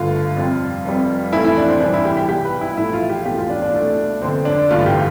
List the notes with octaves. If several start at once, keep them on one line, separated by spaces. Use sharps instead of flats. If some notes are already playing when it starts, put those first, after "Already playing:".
Already playing: G1 G2 D3 A3 F4
F2 C3 G3
F1 F2 C3 G3
F2 E3 A3 E4
E4
D4
C4
C2 C3 E3 G3 D4
E4
G4
G4
B1 B2 G3 G4
B4
E4
A1 A2 F3 A3 E4
F4
G4
E1 E2 B2 A3 G4
F4
D4
D4
C2 B2 A3
F1 F2 D3 C4
D4
A1 G2 D3 A3 F4
G4